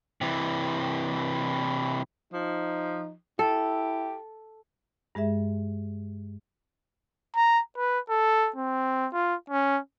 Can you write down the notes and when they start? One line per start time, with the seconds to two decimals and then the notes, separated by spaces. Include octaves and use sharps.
0.21 C3 E3
2.33 F3 D#4
3.39 E4 G4 A4
5.15 G2 G#3 G#4 E5
7.36 A#5
7.77 B4
8.09 A4
8.56 C4
9.13 F4
9.50 C#4